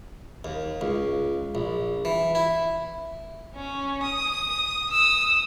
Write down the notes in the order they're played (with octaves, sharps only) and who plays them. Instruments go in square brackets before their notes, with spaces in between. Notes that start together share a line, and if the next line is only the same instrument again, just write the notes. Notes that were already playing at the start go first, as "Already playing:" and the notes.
[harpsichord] D#2
C#2
A#1
E3
E4
[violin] C#4
D#6
D#6 E6